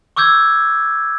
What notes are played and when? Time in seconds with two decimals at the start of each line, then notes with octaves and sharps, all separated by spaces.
0.16 C#6 D6 E6 G6 G#6